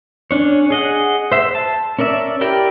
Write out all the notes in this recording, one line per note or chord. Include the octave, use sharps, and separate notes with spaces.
C#4 D4 C#5
G#4 D#5 F#5
C5 E5
A5
C#4 A#4 D5 E5
E4 G4 A#4 D5 G5